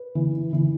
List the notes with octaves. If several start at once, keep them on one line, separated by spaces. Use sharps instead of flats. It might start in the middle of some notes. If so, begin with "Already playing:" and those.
Already playing: B4
E3
E3